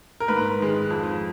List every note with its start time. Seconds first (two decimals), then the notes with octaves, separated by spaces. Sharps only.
0.20 A#4
0.28 G#2 B4
0.59 D#3 G#3
0.90 F2